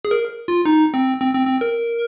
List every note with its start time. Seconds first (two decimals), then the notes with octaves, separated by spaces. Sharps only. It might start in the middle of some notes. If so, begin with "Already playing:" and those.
0.05 G#4
0.11 A#4
0.48 F4
0.65 D#4
0.94 C4
1.20 C4
1.34 C4
1.47 C4
1.61 A#4